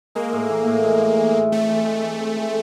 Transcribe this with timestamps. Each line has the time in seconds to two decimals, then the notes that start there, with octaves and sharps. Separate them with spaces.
0.15 G#3 A#3
0.33 A2
0.49 E3
0.67 A2
0.84 G#3
1.00 A2
1.18 E3
1.35 A2
1.52 A3 C4
1.69 E3
1.86 G#3
2.03 E3
2.20 C4
2.37 E3